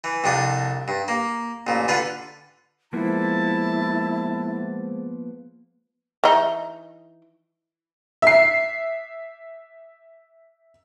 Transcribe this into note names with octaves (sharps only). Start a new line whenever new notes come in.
E3
C2 F2 D4 D#6
G2
A#3
A1 A#2
D3 F4 B4
F3 G#3 A#3 B3 E4 G#4 C5 A5
E3 D#4
E5 C7